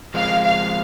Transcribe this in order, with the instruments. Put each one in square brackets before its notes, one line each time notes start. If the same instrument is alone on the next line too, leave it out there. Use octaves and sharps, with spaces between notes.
[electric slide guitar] F3 G#3 C4 [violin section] F5
[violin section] F5